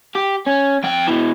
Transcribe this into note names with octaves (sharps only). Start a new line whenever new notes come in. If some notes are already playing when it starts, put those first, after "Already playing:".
G4
C#4
F2 G5
B2 E3